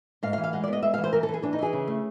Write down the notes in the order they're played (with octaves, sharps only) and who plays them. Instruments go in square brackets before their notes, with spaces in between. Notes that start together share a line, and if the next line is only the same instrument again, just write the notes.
[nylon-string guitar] G#2 F5
F5
E3
F5
G#3 F#5
D5
B3 D#5
G#3 E5
F5
E3
C5
E3 A#4
A4
E3
G#4
E3 D4
D#4
E3 G#4
C#3
A3